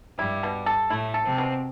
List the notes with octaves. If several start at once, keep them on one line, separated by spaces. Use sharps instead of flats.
G2 G3 E4
B2
A4
A2 A3 E4
A4
C3 C4
B2